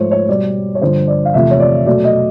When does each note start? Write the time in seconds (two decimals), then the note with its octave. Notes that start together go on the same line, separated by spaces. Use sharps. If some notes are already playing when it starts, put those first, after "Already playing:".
Already playing: G#2 F3 A3 C5 C#5
0.11 C#5
0.29 B2 G3 D5
0.75 C#5
0.81 G2 D3 F3 C5
1.08 D5
1.25 F5
1.34 E2 C3 F3 A3 E5
1.51 C#5
1.60 D5
1.86 B2 F#3 A3 D5
2.04 D#5